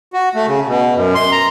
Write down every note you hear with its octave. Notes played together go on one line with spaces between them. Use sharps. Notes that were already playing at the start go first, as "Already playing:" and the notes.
F#4
A3
C#3
B2
F#2
C6
A#5